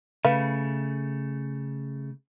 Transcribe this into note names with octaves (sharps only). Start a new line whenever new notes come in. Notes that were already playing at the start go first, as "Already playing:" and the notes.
C#3 A3 B4 F5